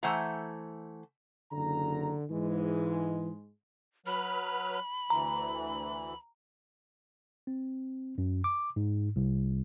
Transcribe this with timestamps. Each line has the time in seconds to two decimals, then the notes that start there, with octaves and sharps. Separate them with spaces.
0.03 E3 A3 C5 F#5 G#5 A#5
1.52 F#1 D3 A#5
2.30 G#2 E3 G#3
4.06 F#3 B4 B5 F6
5.10 D2 E3 A#5
7.47 C4
8.18 F#2
8.44 D6
8.76 G#2
9.16 C2